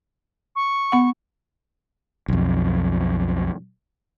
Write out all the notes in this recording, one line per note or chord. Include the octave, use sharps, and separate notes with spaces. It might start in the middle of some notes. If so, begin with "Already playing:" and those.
C#6
B3 F#5
B1 F2